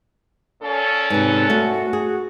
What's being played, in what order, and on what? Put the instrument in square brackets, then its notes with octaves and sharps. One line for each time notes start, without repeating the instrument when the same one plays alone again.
[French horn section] A#2 C#4 A4
[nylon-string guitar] G#2 C3 [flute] B4
[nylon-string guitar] A3 B3 [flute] F#4
[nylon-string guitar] G#4